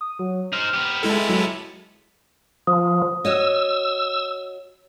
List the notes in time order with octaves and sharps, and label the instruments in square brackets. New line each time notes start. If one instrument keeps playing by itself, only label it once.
[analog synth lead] D#6
F#3
[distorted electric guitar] D#4 C5 [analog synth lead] F6
[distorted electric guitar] B3 G4
[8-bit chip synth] G#3 E4 A4
[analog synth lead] F#3
[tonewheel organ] F3 [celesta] D#6
[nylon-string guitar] F#4 C#5 D#5 [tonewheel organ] E6